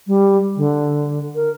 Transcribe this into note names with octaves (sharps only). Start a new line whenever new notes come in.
G3
D3
A#4